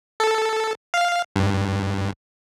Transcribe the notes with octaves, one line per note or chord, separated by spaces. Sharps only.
A4
F5
G2